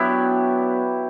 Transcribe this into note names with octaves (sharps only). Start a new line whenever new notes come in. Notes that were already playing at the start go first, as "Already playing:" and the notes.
Already playing: F#3 B3 D4 E4 G4